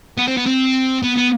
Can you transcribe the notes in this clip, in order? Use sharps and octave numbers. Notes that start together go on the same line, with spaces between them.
B3
C4
B3
C4
B3
B3